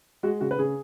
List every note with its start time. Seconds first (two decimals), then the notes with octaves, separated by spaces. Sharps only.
0.23 G#3 F#4
0.41 C#3 F#4
0.51 B4
0.59 C#3 G#4